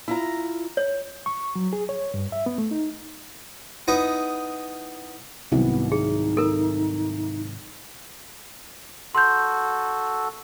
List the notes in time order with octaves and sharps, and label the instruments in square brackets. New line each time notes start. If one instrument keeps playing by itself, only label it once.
[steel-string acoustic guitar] E4 F4 A#5
[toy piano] C#5
[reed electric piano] C#6
F#3
G#4
C#5
G2
E5
B3
A3
D#4
[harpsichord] B3 D#4 E4
[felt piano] C2 [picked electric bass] G#2 D#3 F#3 [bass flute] B3
[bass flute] D#4 [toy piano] G#4
[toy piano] A4 A#4
[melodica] F#4 A4 [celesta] C6 G6